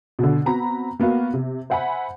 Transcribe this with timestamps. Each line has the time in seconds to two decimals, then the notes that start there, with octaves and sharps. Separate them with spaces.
0.19 B2 D3
0.46 B3 C4 F#4 A#5 B5
1.00 A#3 B3 F#4 F5
1.34 C3
1.70 C5 E5 F#5 G#5 B5